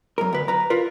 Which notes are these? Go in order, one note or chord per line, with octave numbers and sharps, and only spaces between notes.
F#2 A#4
D2 B4
B4 A#5
F4 A#4 B4